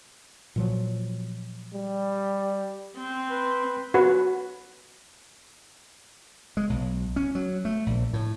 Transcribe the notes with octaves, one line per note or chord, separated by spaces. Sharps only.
A#2 F3 F#3
G3
C4
B4 B5 C6
F#4 B4
G#3
B1
C#4
F#3
A3
A#1
A2